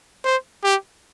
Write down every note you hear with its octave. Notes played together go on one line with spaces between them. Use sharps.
C5
G4